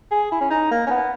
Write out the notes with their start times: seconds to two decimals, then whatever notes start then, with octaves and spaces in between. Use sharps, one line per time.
0.11 G#4
0.32 E4
0.41 C#4
0.50 D#4
0.71 A#3
0.86 C#4
0.90 B3